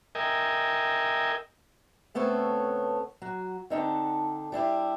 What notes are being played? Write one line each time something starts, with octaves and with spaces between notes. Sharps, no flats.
A#4 D#5 E5 G5 G#5
C#3 A3 B3 C4 A4 C#5
F#3 F#4
D3 C4 D#4 F#5 A5
G3 D4 E4 G4